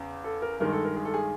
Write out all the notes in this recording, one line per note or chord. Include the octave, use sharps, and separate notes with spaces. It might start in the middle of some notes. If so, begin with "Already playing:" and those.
Already playing: E2 C#3
A4
A#4
G2 D#3 G#3 A#4
A4
A#4
G#4
A4
G#4